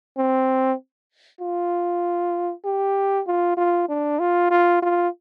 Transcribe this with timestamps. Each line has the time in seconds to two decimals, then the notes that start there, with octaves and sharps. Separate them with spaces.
0.18 C4
1.41 F4
2.65 G4
3.27 F4
3.57 F4
3.89 D4
4.19 F4
4.51 F4
4.82 F4